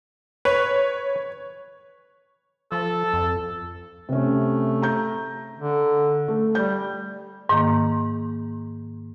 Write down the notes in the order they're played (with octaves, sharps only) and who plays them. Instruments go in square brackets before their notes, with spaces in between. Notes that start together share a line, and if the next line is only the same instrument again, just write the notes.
[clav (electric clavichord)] B4 [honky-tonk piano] C#5
[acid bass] F3 [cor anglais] A4
[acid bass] F2
[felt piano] C3 C#4 [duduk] A3
[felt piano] A#5 G6
[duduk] D3
[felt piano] A3
[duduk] G3 [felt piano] G6
[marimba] G#2 D#3 A#3